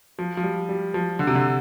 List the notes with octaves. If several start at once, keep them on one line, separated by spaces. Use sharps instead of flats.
F3
F3
G3
G3
F3
D3
C3
D3